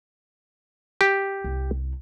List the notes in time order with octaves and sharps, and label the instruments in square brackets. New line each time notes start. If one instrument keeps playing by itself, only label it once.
[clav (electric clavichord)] G4
[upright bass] C2